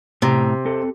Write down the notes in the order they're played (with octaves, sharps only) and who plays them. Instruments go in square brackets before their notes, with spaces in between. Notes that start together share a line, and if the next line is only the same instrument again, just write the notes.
[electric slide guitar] A2 A#5 [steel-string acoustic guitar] C3
[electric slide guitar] C4 A4